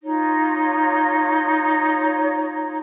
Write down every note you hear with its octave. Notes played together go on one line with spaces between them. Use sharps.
D#4 F4 C#5